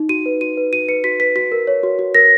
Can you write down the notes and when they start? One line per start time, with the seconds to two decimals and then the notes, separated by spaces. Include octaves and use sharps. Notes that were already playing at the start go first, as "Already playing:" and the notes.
Already playing: D#4
0.09 F#4 D#7
0.26 B4
0.41 F#4 D#7
0.57 B4
0.73 F#4 D#7
0.89 B4 C#7
1.04 F#4 B6
1.20 B4 B6
1.36 F#4 B6
1.52 A#4
1.67 C#5
1.83 F#4
1.99 F#4
2.15 A#4 A#6